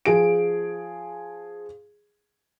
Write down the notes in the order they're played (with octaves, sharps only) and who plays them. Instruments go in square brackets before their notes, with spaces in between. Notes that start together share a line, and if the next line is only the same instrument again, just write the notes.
[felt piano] F3 G#4 D7